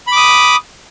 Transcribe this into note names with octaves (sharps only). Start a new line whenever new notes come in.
B5 D6 D#6